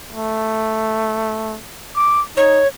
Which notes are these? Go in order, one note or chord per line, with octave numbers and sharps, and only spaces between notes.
A3
D6
D#4 C#5